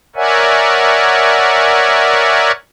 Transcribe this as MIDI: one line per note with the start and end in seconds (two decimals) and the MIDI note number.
0.16 2.52 70
0.16 2.52 73
0.16 2.52 74
0.16 2.52 76
0.16 2.52 78
0.16 2.52 80